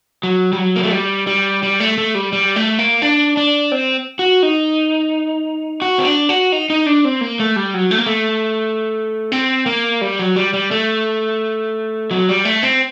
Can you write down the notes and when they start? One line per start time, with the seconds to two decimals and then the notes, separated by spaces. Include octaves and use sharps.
0.23 F#3
0.53 G3
0.58 F#3
0.76 A#3
0.84 A3
0.92 G3
1.27 G3
1.63 G3
1.80 A3
1.98 A3
2.15 G3
2.33 G3
2.56 A3
2.79 A#3
3.02 D4
3.37 D4
3.72 C4
4.19 F#4
4.43 D#4
5.82 F#4
5.98 C4
6.05 D4
6.29 F#4
6.52 D#4
6.70 D#4
6.86 D4
7.05 C4
7.21 A#3
7.40 A3
7.56 G3
7.74 F#3
7.91 A3
7.98 A#3
8.06 A3
9.32 C4
9.66 A#3
10.01 G3
10.19 F#3
10.36 G3
10.54 G3
10.71 A3
12.11 F#3
12.29 G3
12.45 A3
12.63 C4